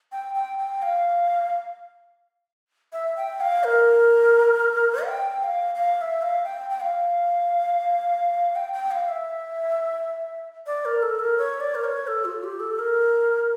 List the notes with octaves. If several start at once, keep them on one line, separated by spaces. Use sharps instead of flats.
G5
G5
G5
F5
E5
G5
F5
A#4
G5
G5
F5
F5
F5
E5
F5
G5
G5
F5
G5
G5
F5
E5
D5
A#4
A4
A#4
C#5
D5
A#4
C#5
A4
F4
G4
A4
A#4